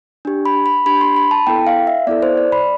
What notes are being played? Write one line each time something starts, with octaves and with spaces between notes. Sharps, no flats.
D4 G4
B5
B5
D4 G4 B5
C6
B5
A5
B3 E4 A4 G5
F5
E5
B3 E4 A4 D5
C5
D5
B5